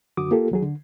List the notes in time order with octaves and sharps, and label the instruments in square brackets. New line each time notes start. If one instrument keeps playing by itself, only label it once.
[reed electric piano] F#2 D3 F#4 D6 D#6
A#3 F4 G4 A4
D#2 F#3 G#4
D3